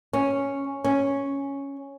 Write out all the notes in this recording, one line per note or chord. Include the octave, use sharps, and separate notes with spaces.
C#4
C#4